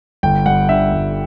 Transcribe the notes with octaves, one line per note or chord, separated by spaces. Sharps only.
G1 G5
G2 F#5
D3 E5
G1